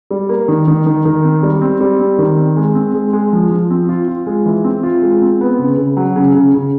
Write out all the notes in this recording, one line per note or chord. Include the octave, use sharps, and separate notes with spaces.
G3
A#3
D#3
D#3
D#3
D#3
C4
G3
C4
G3
C4
D#3
C4
G#3
C4
G#3
G#3
F3
F3
C4
F4
F4
G#3
E3
C4
F4
G#3
C4
B3
C#3
C#3
F#3
C#3
C#3
C#3